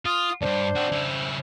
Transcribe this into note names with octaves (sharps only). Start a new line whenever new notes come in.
F4 D#6
D2 G2 D4 C5
C4 F#4
C#3 E4